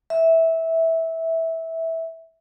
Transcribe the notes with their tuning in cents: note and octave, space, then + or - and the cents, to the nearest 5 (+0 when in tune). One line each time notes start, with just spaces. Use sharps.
E5 -15